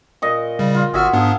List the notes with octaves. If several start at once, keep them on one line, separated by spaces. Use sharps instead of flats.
A#2 D#5 C#6
C#3 G3
F4
G1 F#4 G#4 E5 F#5 F6
G#2 B3 D4 G#4 F5